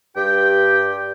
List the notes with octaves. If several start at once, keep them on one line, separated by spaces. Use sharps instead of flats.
G2 G4 G5